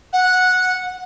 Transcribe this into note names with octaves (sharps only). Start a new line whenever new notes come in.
F#5